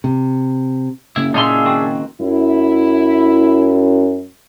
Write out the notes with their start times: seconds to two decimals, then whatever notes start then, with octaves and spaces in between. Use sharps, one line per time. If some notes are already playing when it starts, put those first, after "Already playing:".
0.04 C3
1.16 F#1 F#2 C#3 A#3 E4
1.34 A#2 F#3 D4 D#4 F4 G#4 E5 C6
1.65 D#3 C4 F#4
2.21 F#2 E4